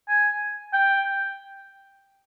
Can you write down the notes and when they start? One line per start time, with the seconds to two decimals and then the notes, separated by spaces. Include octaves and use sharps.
0.09 G#5
0.73 G5